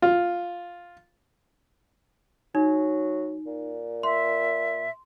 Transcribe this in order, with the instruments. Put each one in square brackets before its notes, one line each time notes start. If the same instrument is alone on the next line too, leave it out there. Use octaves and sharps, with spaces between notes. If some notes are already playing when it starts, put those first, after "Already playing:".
[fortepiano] F4
[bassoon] F#3 [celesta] D#4
[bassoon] A#2
[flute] E5 [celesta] C6